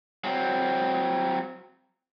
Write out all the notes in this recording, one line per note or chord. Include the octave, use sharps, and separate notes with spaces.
F#3 C4